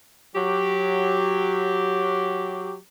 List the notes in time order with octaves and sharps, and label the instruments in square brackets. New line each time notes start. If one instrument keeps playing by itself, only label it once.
[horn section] F#3 G4